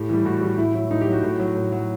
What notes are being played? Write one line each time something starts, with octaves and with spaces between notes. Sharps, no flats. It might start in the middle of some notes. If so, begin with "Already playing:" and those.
Already playing: A2 G4
E3 G3
A2 F#4
E3 G3
A2 E4
F#3 E4
A2 D#4
G4
F#3
F#4
A2
F#3
A2
F#3